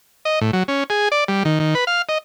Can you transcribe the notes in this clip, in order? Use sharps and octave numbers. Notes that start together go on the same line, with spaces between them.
D#5
A2
F#3
C#4
G#4
D5
G3
D#3
D#3
B4
F5
D#5